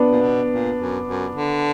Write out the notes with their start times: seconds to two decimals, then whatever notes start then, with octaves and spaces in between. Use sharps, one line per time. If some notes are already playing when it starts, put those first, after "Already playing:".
Already playing: B3 D4
0.11 A#2
0.21 B2
0.51 A#2
0.78 F#2
1.07 F#2
1.36 D3